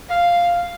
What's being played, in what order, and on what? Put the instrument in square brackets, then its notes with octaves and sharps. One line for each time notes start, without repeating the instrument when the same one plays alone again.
[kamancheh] F5